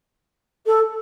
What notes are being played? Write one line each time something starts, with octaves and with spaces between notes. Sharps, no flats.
A4